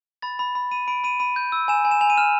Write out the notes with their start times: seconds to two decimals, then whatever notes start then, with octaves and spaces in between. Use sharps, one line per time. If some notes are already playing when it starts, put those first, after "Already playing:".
0.22 B5 A6
0.39 B5
0.55 B5
0.71 B5 D#7
0.88 B5 D7
1.04 B5 D#7
1.20 B5 D#7
1.36 G6
1.52 E6
1.68 G#5 E7
1.85 G#5
1.91 E7
2.01 G#5 F7
2.10 D#7
2.17 F6 E7